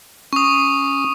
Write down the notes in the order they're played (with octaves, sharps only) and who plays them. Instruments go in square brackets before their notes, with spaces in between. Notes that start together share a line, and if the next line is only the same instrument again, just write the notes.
[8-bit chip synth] C#4 [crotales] C#6 D#6